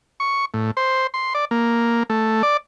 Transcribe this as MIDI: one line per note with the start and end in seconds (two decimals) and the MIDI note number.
0.20 0.45 85
0.54 0.71 45
0.77 1.07 72
1.14 1.34 84
1.35 1.45 74
1.51 2.03 58
2.10 2.42 57
2.43 2.57 74